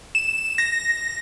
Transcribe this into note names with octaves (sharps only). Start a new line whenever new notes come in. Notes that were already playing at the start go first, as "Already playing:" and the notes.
E7
A#6